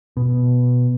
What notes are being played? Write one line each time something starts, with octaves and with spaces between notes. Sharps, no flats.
B2